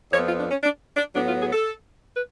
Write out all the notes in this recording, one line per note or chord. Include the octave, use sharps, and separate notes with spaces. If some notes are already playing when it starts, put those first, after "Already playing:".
F2 F3 B3 C#5
F4
D4
C#4
D4
D4
A2 F#3 B3 D4
F4
G#4
A4
B4